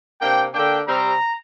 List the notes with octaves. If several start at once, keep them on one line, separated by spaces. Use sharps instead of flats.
C3 A#3 D4 G5
D3 A#3 D4 G5
C3 G3 C4 A#5